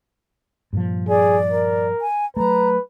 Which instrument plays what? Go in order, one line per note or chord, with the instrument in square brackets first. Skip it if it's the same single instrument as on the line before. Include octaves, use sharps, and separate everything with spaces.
[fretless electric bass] G2 A#2 F3
[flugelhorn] G#4 [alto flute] D5
[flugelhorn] A#4
[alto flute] G#5
[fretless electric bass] F#3 A3 [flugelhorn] B4 [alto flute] A#5